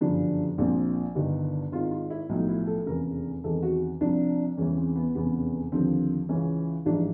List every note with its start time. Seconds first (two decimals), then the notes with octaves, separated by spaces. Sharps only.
0.01 G1 F#2 C#3 F3 D4
0.58 A#1 A#2 F3 C4
1.15 G1 G2 D#3
1.72 G#1 G#2 D#3 F4
1.91 F4
2.10 E4
2.29 B1 A2 F3 D#4
2.49 E4
2.67 A4
2.86 F1 E2 C#3 A#4
3.44 E2 C3 D#3 A4
3.63 F#4
4.01 C2 C3 F3 D4
4.57 E2 C#3 E3 C#4
4.77 C4
4.96 B3
5.15 F1 E2 C#3 B3
5.72 D#2 D3 F3 C4
6.29 C#2 C#3 E3 C#4
6.86 A1 G#2 F3 D4